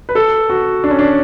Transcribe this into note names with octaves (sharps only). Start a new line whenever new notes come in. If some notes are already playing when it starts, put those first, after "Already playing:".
B4
A4
F#4
D4
C#4
D4